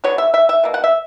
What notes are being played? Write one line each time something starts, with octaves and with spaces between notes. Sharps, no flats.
D3 F#3 B3 C#5
E5
E5
E5
B2 A#3
F#5
E5